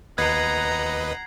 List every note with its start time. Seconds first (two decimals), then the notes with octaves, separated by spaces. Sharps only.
0.18 D#2 B4 D#5 F#5 A#5 G#6 C7